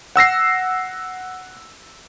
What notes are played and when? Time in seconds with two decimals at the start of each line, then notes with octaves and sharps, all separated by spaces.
0.16 F#5 E6 A#6 C7